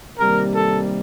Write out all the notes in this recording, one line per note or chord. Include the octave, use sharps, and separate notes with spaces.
C3 D#3 G3 A#3 A#4
A4